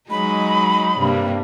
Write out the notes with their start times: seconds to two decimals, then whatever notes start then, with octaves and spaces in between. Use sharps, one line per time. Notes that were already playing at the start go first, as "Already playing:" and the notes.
0.10 F#3 G#3 D#4 B5
0.98 G2 C3 A#3